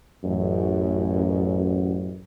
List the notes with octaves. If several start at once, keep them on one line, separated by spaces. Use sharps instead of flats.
A1 F#2